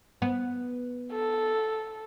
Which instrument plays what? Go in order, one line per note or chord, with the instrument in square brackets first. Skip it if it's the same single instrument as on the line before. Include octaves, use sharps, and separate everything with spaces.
[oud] B3
[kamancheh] A4